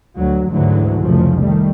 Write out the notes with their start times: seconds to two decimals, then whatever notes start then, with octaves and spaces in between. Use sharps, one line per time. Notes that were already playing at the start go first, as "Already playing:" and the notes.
0.17 D2 F#3
0.51 D2 G#2 D3 E3 F#3
1.04 F1 C2 C#3 F3 A3
1.39 D#3 G3 A3